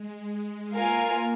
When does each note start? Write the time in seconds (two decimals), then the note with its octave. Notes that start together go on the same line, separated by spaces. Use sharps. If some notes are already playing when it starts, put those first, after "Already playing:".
Already playing: G#3
0.74 A#3 F4 A#4 F5 G#5